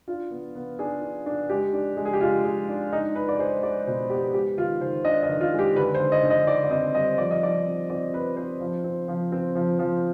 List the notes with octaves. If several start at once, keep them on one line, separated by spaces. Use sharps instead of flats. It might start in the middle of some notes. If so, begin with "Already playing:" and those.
D4 F4
B3
B3
D4 G#4
D4
D4
G#3 G4
D4
G#3
G#4
G4
G#3 F4
G#3
D4
G#3 D#4
D4 B4
D5
G#3 C5
G#3 D5
B2 C5
B3 G4
G#3 G4
D#3 F4
D#3 C5
D4 D#5
D#5
D#3
F4
G#3
G4
D3 B4
C5
D3
D#5
D3
D#5
D3 D5
D5
C4 D#5
G3 D#5
F3 D5
D#5
F3 D5
C4
C4 D5
C4 B4
C4 C5
F3
C4
F3
C4
F3
F3